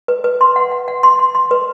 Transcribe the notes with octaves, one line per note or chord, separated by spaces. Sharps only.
B4
B4
C6
F#5
F#5
F#5
C6
C6
C6
B4